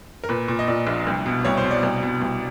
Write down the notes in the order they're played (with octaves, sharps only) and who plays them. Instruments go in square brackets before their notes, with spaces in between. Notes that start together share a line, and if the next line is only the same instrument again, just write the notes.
[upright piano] A#4
A#2 B4
A#2
D#5
A#2 D5
A#1
C2
B2
C2 C#5
C5
B2
D5
C2
B2
C2